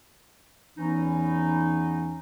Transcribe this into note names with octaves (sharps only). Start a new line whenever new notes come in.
E2 E3 B3 C#4 D#4